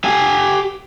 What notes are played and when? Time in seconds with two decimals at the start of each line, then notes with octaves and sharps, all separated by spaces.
0.04 G4 G#5